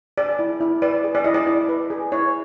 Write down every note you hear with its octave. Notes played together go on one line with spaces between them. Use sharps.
G#4 D5
E4
E4
B4 D5
G#4
D5
E4 D#5
D5
E4
B4
G#4
E4 C#5